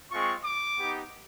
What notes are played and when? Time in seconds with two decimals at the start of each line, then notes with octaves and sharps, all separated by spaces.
0.10 G#3 C4 F4 C#6
0.43 D6
0.77 B3 D#4 G4